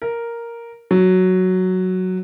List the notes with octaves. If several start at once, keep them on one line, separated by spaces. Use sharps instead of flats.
A#4
F#3